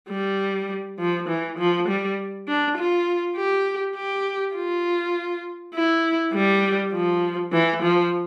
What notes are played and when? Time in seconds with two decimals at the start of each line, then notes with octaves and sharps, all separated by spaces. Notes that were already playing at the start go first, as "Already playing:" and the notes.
0.09 G3
0.99 F3
1.29 E3
1.58 F3
1.88 G3
2.48 D4
2.77 F4
3.36 G4
3.95 G4
4.56 F4
5.74 E4
6.34 G3
6.93 F3
7.53 E3
7.82 F3